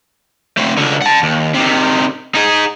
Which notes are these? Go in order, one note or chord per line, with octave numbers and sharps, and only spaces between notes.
A3 C4
C#2 D3
F#5 A5
D#2
C3 D#3
D#4 G#4